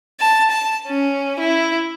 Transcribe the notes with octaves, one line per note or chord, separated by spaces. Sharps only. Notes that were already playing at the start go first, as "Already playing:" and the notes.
A5
A5
C#4
E4